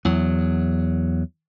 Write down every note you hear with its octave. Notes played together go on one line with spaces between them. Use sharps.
E2 F#3